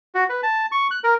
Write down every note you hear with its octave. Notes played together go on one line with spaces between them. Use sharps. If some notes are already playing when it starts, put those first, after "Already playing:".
F#4
B4
A5
C#6
F#6
A#4